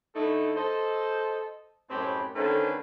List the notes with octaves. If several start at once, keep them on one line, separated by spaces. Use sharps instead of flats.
D3 A3 D#4 E4 A4
A4 C5 D#5
F#2 A2 C4 G4 D#5 B5
D3 D#3 A3 C#4 B4 C5